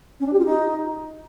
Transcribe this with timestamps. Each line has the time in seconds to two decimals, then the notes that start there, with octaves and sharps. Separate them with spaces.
0.20 C#4
0.26 D4
0.33 G4
0.39 F4
0.45 D#4